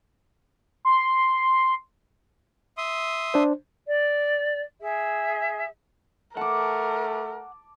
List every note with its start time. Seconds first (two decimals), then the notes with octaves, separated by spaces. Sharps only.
0.85 C6
2.77 E5 C6 D#6
3.34 D4 C5
3.87 D5
4.80 G#4 E5
6.37 A3 A#4 F#5 A5 D6